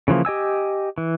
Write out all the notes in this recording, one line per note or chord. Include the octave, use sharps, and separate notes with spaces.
C#3 E3 F3 A#3
G4 D#5 G#5 E6
E3